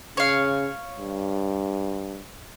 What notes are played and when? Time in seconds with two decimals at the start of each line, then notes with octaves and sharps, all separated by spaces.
0.17 C#3 C#5 F5
0.98 G2